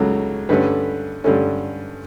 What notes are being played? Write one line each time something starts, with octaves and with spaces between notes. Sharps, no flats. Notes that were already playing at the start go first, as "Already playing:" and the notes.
Already playing: C#2 C#3 F#3 A3
G2 D3 A3 C#4 B4
G2 D3 A3 C#4